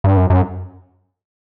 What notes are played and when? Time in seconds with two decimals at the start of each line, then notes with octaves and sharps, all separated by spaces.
0.04 G2
0.17 F#2
0.30 F#2